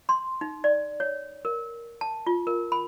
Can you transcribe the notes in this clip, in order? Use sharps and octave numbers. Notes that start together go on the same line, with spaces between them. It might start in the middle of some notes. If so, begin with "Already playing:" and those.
C6
D#4
D5
C#5
A#4
A5
F4
A#4
B5